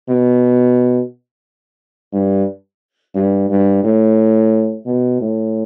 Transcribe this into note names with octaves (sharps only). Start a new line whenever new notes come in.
B2
G2
G2
G2
A2
B2
A2